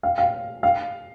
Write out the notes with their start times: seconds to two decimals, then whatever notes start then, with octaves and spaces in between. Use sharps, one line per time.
0.03 F5
0.18 F5
0.63 F5